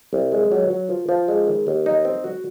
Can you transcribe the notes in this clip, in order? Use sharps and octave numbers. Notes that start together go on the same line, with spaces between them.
C2
G#3
F#3
F#3
F3
F3
G#3
D#3
D#2
D#4
C4
F#4